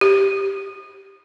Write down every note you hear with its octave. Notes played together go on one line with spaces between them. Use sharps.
G4